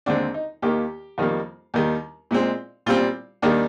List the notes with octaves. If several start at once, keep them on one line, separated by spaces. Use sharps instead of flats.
D#2 D3 G#3 C4 D4
D#4
D#2 D#3 A#3 G4
F2 D#3 G3 A#3
D#2 D#3 G3
A#2 G#3 C4
A#2 G3 C4 F4
D#2 D#3 G3 A#3 D4